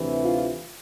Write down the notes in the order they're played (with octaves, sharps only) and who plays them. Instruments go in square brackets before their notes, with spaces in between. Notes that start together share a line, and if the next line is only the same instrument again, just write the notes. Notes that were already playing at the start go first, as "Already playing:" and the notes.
Already playing: [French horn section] D2 C3 E3
F4